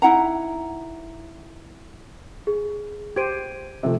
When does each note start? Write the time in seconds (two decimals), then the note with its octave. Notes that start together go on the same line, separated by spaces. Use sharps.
0.02 D#4 E4 F#5 A#5
2.47 G#4
3.16 G4 C5 G#6 D7 D#7
3.83 C3 F3 A3